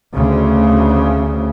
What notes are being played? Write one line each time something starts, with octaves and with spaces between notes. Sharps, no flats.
D2 C#3